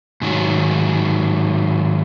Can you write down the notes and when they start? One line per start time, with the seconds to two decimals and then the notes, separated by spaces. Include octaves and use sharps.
0.22 G#2 D#3 F#3